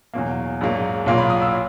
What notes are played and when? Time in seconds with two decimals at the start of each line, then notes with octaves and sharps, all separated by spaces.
0.14 E2 B2 F#3 A#3
0.61 A#1 G#2 F#3 A#3
1.06 B1 A#2 F#3 A#3
1.18 B5
1.30 D#6
1.42 E6